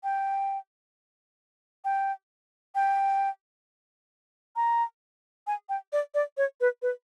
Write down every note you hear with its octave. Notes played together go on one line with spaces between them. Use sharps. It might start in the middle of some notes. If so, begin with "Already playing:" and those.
G5
G5
G5
A#5
G#5
G5
D5
D5
C#5
B4
B4